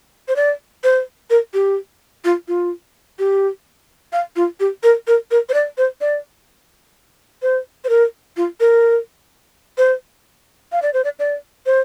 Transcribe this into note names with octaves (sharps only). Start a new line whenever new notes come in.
C5
D5
C5
A#4
G4
F4
F4
G4
F5
F4
G4
A#4
A#4
A#4
C5
D5
C5
D5
C5
C5
A#4
F4
A#4
C5
F5
D5
C5
D5
D5
C5